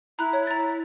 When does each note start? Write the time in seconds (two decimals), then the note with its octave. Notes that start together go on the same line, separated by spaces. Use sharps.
0.19 E4 A#5 B5 F#6
0.33 C#5
0.47 A#5 A6